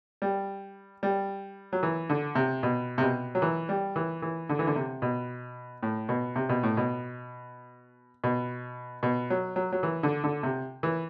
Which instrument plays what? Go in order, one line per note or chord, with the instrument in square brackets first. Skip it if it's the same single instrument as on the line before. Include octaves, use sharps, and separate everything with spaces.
[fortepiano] G3
G3
F#3
E3
D3
C3
B2
C3
B2
F#3
E3
G3
E3
E3
D3
E3
D3
C3
B2
A2
B2
C3
B2
A2
B2
B2
B2
F#3
F#3
F#3
E3
D3
D3
C3
E3